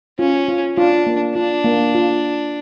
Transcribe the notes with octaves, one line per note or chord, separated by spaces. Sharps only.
C#4 F4
F4
D4 F4
A#3
D4 F4
A#3
F4